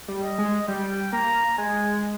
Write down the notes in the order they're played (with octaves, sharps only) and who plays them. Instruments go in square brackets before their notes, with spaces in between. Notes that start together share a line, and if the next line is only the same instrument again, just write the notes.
[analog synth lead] G3
[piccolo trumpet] D#5
[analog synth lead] G#3
[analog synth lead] G3 [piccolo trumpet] G5
[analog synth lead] A#3 [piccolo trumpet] A#5
[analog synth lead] G#3 [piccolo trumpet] G#5